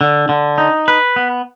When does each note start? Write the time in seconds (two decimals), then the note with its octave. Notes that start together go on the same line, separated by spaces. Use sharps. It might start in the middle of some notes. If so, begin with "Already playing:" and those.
0.01 D3
0.29 D3
0.58 D#4
0.88 B4
1.16 B3